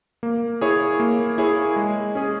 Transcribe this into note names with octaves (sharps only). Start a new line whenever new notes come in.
A#3
E4 G#4 C#5
A#3
E4 G#4 C#5
G#3
C#4 G#4